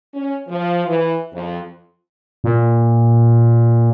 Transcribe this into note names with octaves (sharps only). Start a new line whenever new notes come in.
C#4
F3
E3
F2
A#2